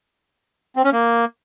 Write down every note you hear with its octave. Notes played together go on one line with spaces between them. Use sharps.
C4
C#4
A#3